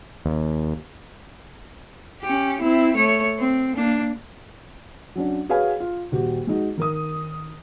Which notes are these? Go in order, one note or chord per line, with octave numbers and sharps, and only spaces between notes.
D#2
C#4 G4
C4 E4
A3 C#5
C4
A#3 D4
F#3 C#4 D4
F#4 G#4 B4 C#5 F5 G#5
F4
D#1 F#4 G4
G#3 D#4 F#4
D#3 A#4 D#6